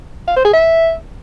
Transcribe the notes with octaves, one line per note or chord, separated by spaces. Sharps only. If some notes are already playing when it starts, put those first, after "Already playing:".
F5
C5
G#4
E5